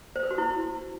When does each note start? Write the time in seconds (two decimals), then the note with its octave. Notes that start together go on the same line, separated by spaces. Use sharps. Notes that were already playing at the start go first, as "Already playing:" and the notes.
0.16 C5
0.23 B4
0.31 F#4
0.38 E4